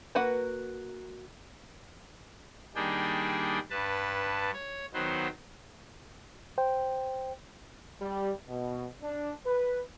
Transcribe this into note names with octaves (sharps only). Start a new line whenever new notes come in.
A#3 F#4 B4 F#5
D#3 G3 A#3 D4 G#4 G5
G2 B4 A5
C#5
D#3 F#3 B3 C5
C5 G5
G3
B2
D4
B4